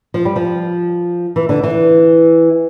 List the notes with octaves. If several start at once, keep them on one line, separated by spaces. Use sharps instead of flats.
F3
G3
F3
E3
D3
E3